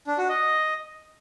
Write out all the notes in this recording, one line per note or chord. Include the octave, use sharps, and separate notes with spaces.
D4
F#4
D#5